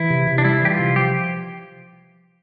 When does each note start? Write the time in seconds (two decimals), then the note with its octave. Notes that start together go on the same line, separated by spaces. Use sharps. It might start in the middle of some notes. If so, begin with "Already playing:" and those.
Already playing: E3 E4
0.10 C3
0.27 C3
0.38 D4
0.44 G3 E4
0.61 E3 G4
0.70 F4
0.79 C3
0.96 F3 G4